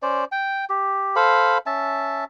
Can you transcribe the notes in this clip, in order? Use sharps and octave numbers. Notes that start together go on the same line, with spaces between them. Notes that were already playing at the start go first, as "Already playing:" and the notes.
C#4 C5 D5
G5
G4
A4 C5 F5 B5
C#4 E5 A5